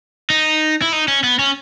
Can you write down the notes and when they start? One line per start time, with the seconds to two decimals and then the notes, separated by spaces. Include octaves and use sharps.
0.30 D#4
0.82 E4
0.93 D#4
1.08 C#4
1.24 B3
1.39 C#4